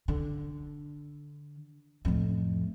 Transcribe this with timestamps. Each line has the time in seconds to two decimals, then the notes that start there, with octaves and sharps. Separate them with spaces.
0.08 D3
2.05 F2 A2